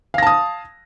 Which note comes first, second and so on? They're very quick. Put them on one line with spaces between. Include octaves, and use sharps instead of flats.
F5 A#6 A5 D#6